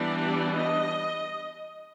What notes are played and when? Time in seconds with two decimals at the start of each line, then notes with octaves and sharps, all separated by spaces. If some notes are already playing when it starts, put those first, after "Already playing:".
Already playing: E3 G3 B3 D4 D5
0.56 D#5